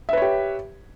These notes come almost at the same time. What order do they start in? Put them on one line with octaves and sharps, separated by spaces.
E5 B4 C#5 G4